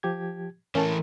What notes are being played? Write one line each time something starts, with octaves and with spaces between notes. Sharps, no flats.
F3 G4 G#6
E3 A3 C#4 A#4 A5